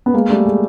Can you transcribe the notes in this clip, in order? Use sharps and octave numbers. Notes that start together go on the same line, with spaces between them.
B3
G#3 A#3
G3 A3
G#3